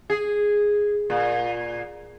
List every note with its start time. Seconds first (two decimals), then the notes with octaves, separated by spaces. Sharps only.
0.10 G#4
1.10 A#2